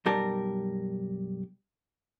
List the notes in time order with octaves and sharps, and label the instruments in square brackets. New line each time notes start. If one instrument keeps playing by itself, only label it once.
[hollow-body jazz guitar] B1 F#2 G3 A#4 A5